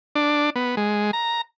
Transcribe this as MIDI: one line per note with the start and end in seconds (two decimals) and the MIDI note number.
0.15 0.50 62
0.56 0.75 59
0.77 1.11 56
1.13 1.41 82